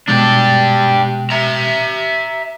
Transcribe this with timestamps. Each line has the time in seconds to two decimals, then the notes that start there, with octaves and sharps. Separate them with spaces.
0.08 B2 G#3 D4 G4
1.31 E5 A#5